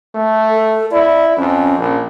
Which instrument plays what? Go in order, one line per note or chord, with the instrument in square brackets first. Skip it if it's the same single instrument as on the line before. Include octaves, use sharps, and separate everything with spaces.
[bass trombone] A3
[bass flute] A4
[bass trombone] E4 [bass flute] D5
[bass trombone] F2 [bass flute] C#4
[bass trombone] A#1